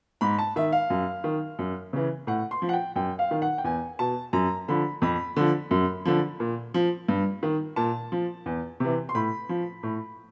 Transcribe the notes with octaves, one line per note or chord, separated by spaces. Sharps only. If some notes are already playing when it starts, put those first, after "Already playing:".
G#2 B5
A5
D#3 E5
F5
F#2
D#3
F#2
C#3 E3
A2 F#5
C6
F3
F#5
G5
F#2 G5
F5
D#3
F#5
G5
E2 G#5
B2 A5
F#2 A#5
D3 F3 B5
F2 B5
D3 F3
F#2
D3 F3
A#2
F3
G2
D#3
A#2 A5
F3
E2
C3 E3
C6
A2 B5
F3
A2